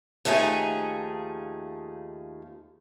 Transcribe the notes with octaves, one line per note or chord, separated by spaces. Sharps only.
D#2 F3 A3 D#4 G#4 G#5